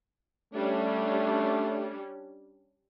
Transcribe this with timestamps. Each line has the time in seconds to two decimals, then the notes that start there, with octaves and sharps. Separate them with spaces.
0.53 G3 A3 C#4 D4